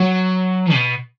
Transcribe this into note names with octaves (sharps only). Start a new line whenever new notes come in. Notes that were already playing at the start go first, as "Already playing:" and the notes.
Already playing: F#3
B2